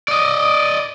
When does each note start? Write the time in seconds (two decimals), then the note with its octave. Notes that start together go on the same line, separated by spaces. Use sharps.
0.08 D5 D#5